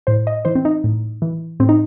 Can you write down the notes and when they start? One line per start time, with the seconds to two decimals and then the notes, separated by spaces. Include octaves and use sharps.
0.07 A2 C5
0.27 D#5
0.45 E3 C5
0.55 C4
0.65 D#4
0.84 A2
1.22 E3
1.60 A2 C4
1.69 D#4